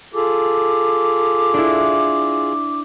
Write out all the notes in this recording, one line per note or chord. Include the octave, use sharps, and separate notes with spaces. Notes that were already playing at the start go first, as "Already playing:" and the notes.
F4 G#4 A4 D6
D4 E4